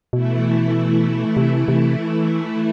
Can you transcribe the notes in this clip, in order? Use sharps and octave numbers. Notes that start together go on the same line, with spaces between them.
B2 E3 A3 E4
C3
C3